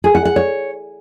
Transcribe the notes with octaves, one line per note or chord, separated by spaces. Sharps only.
G#4
F#5
F#5
C#5